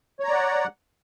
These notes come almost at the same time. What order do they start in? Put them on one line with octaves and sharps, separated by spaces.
C#5 A#5 D5 F#5